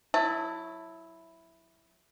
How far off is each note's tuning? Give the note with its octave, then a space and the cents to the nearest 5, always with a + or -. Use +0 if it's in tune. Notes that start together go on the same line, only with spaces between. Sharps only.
F#3 -15 E4 +0 A5 +20